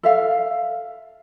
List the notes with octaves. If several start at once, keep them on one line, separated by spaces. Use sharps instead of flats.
A4 E5 F5